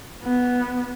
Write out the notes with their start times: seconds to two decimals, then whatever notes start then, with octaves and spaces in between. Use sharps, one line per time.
0.23 B3